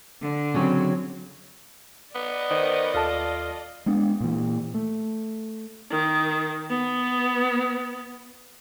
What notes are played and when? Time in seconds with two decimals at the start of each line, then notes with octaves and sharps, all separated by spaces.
0.22 D3
0.54 C#3 F#3 C4
2.15 B3 D5 D#5
2.50 D#3 C5
2.94 D#2 F4 A4 A5
3.86 G#3 B3 D4
4.20 A#2 E3
4.74 A3
5.91 D#3
6.69 B3